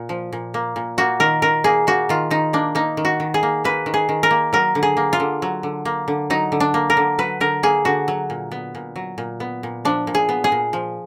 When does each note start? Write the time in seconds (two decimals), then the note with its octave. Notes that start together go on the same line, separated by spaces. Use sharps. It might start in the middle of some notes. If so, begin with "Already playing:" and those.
Already playing: A#2
0.09 F3
0.33 A#2
0.54 A#3
0.76 A#2
0.98 A#3 F#4
1.20 D#3 A#4
1.42 D#3 A#4
1.64 A#3 G#4
1.87 A#3 F#4
2.09 D#3 F4
2.30 D#3 D#4
2.53 A#3 D4
2.75 A#3 D#4
2.97 D#3
3.05 F#4
3.20 D#3
3.34 G#4
3.43 A#3
3.64 A#3 B4
3.86 D#3
3.94 G#4
4.09 D#3
4.23 A#4
4.31 A#3
4.53 F#3 A#4
4.75 D3
4.83 G#4
4.97 A#3
5.13 F4
5.20 D3
5.42 F#3
5.63 D3
5.85 A#3
6.08 D3
6.30 F#3 D#4
6.52 D3
6.60 D4
6.74 A#3
6.90 A#4
6.97 D3
7.18 F#3 B4
7.40 D3 A#4
7.63 A#3 G#4
7.85 D3 F#4
8.08 F#3
8.30 A#2
8.52 B3
8.75 A#2
8.96 F#3
9.18 A#2
9.40 B3
9.63 A#2
9.85 F3 D4
10.07 A#2
10.14 G#4
10.29 B3
10.44 G#4
10.52 A#2
10.73 F3